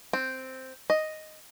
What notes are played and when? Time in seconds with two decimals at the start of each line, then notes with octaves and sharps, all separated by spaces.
0.13 C4
0.90 D#5